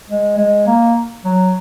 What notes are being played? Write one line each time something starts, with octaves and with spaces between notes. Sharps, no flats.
G#3
G#3
A#3
F#3